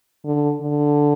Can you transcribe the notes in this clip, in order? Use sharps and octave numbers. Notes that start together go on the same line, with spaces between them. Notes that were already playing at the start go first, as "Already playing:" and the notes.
D3
D3